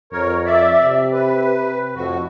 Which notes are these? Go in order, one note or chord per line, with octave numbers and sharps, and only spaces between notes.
F2 A#4 C#5
D5 E5
C3
B4
F2 A2 F#4